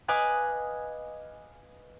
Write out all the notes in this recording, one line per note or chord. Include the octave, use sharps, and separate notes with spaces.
B4 D#5 F5 G#5 D6 F#6